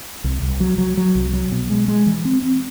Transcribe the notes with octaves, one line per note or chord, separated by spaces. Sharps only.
C2
C2
F#3
F#3
F#3
C2
F#3
B2
G#3
G#3
E3
C4
C4